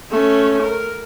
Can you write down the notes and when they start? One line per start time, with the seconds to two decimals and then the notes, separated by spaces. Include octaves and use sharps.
0.11 A3 C#4
0.61 A#4